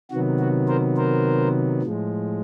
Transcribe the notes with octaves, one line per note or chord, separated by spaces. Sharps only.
C3 D#3 F#3 B3 F#4
F#4
A#4 C5
A#4 C5
A2 F3 G#3